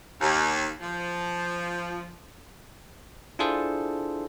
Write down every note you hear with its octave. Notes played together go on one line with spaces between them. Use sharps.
D#2
F3
D4 E4 F4 G#4 A4 C5